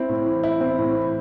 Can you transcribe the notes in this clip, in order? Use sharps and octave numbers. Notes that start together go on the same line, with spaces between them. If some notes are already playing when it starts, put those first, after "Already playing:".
Already playing: C4 E4
A2
E3
E4
C4
A2
E3